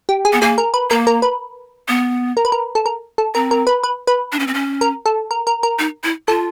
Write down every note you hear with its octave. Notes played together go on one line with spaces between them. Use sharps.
G4
G#4
B3
A#3 G#4
A#4
B4
A#3 A#4
A#4
B4
B3
A#4
B4
A#4
A4
A#4
A4
C4 A#4
A#4
B4
B4
B4
D4
C#4
C4
C#4
A#4
A4
A#4
A#4
A#4
D#4
E4
F4 A4